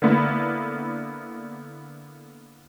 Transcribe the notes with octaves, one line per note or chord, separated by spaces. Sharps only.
D3 A#3 B3 E4